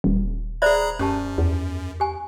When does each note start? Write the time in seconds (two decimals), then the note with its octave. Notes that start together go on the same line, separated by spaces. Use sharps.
0.04 D#1
0.62 G#4 C5 D5 E5 A#5 B5
0.99 F#2 C#4 G4 A5
1.38 E2
2.00 G4 G#5